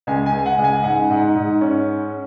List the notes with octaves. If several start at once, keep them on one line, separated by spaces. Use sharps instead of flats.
C#2 G#5
G#5
C#2
G#5
F#5
C#2
G#5
G#2 F#5
G#2
G#2
C#4